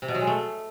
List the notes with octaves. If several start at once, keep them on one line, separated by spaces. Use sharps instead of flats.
C3
B2
F#3
G#3
A3